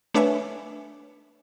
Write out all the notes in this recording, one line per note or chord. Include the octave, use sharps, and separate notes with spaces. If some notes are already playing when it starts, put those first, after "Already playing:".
A3 D4 B4 C#5 E5 G#5